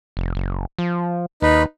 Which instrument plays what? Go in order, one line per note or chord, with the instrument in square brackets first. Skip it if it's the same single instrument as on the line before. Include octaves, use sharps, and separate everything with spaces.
[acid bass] F1
F#1
F3
[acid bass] D#2 [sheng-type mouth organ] D#4 B4